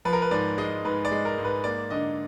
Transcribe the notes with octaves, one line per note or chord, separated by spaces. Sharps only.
F3 B4
A#4
B4
G#2 D5
G#3 D#5
G#2 B4
D5
G#3
A#4
G#2
B4
A#3 D5
D3 D#5